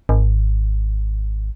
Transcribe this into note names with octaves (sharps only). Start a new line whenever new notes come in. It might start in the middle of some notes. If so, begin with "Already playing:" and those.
G#1